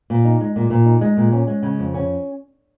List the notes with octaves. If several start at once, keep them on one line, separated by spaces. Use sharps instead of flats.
A#2
D#4
G#3
A#2
A#2
D#4
G#3
A#2
C#4
G#3
C#3
F2
C#4